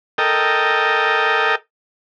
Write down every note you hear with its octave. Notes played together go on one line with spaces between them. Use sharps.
A4 A#4 D#5 G5